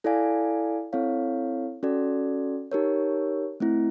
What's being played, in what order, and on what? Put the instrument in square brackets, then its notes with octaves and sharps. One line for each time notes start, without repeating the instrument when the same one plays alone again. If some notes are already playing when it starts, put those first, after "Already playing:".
[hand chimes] E4 A4 D5 F5 G#5
C4 E4 A4 C#5 F5
C#4 F#4 A4 D5
D#4 G4 A#4 C#5
A3 C4 E4